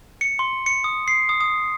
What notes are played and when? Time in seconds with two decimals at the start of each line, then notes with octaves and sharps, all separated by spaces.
0.21 C#7
0.39 C6
0.66 C#7
0.84 D#6
1.08 C7
1.29 D#6
1.41 D#6